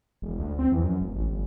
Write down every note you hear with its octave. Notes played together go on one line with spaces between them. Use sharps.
E1
D2
C4
E2
F#2
E1
A1
G1